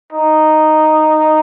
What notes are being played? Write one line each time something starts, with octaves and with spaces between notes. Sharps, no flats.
D#4